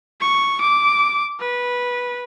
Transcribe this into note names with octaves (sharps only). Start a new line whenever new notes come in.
C#6
D6
B4